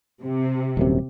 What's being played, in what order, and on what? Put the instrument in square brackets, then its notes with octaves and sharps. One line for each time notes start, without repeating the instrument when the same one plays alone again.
[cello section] C3
[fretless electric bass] D#1 F#2 C3